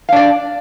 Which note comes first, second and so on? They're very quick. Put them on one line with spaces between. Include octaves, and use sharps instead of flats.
F5 D4 D5